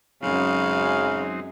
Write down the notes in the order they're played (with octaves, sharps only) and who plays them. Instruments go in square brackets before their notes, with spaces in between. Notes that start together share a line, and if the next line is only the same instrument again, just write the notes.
[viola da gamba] F#2 G#3 [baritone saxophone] C#3 [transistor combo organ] F#3 C4 D#4 [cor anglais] F5